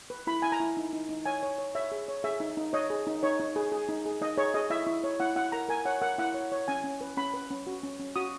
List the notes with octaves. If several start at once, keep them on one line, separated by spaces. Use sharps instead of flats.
B4
E4 B5
E4 G#5
A#5
E4
D#4
D#4
D#4
C#5 G#5
C#5
C#5
C#5 E5
G#4
C#5
G#4 E5
D#4
D#4
C#5 D#5
G#4
D#4
D#4 C#5
D#4
G#4
G#4
D#4
G#4
D#4 D#5
G#4 C#5
G#4 D#5
E4 E5
E4
C#5
E4 F#5
E4 F#5
A#4 A#5
A#4 G#5
C#5 F#5
A#4 F#5
E4 F#5
C#5
C#5
C#4 G#5
C#4
B4
C#4 B5
B4
C#4
F#4
C#4
C#4
F#4 D#6